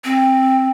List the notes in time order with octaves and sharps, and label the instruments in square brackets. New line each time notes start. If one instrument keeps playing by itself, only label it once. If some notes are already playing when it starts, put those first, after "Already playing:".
[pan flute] C4